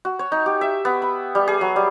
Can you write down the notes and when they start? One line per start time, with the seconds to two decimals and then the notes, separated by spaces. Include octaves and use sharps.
0.05 F#4
0.19 C#5
0.32 D#4
0.46 G4
0.61 E5
0.85 B3
1.02 B5
1.35 G3
1.48 G#4
1.61 F#3
1.76 G3